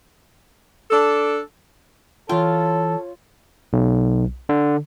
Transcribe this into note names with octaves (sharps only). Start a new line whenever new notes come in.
D4 A4
E3 F4 A4 C#5 G5
B1
D3